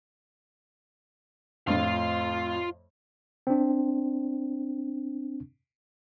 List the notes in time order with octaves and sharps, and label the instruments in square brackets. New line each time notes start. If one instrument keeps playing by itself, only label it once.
[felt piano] F2 A2 [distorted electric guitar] F4 F5
[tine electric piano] C4 D4